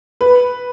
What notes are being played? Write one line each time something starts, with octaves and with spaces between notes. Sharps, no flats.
B4